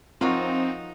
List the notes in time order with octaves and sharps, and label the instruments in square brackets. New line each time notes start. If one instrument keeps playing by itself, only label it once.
[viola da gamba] F3 D#4 [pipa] F#3 A#3 F#4 [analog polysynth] C4 [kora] F4